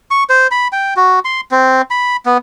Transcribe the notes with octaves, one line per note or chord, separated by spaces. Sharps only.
C#6
C5
B5
G5
F#4
C6
C4
B5
B3